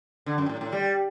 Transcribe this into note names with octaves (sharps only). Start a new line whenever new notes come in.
D3
F#2
A2
A2
G3